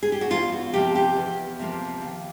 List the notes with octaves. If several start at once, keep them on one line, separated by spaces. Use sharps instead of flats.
G#4
G4
F#4
E2 F4
F#4
C3 F3 A#3 G4
G4
E2
C3 F3 A#3
D#2